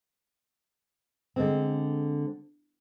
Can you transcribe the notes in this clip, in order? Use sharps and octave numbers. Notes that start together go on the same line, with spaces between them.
D3 G#3 C4